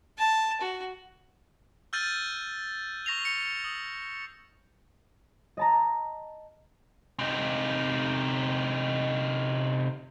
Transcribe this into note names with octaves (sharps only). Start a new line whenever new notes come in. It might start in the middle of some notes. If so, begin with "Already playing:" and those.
A5
F#4
E6 F6 G6 A6 D#7 F#7
C#6 A#6 C7 F7 G7
C#7
D#6
D#5 A5 A#5
C3 D#4